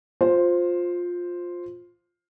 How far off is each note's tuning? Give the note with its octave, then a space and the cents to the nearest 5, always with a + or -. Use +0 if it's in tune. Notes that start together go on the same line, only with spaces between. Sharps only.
F4 +15 C5 +0